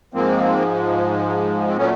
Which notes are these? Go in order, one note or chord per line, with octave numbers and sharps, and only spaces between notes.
G#2 F3 G#3 A#3 C4
C4
A#2 F#3 A3 B3 C#4